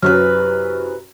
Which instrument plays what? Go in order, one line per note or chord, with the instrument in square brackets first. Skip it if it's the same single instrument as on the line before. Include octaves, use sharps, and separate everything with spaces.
[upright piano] F#2 F#3 C#4 [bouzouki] C3 E3 B4 [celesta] F6